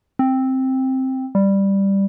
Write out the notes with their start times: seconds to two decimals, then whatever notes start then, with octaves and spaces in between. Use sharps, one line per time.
0.19 C4
1.35 G3